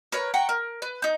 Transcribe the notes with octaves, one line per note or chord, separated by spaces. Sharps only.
A#4 B4 C#5
F#5 G5 A#5 C#6
A#4
B4
D#4 G6